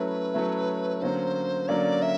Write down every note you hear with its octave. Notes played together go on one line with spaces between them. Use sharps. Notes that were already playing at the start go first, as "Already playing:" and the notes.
Already playing: F#3 A3 C#4 E4 B4
F#3 A3 C#4 E4
D3 F#3 A#3 C#4 C5
D3 F#3 A#3 C#4 D5
E5